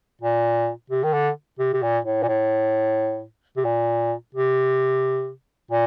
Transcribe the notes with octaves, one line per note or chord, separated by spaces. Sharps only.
A#2
C3
D#3
D3
C3
C3
A#2
A2
A#2
A2
C3
A#2
C3
A#2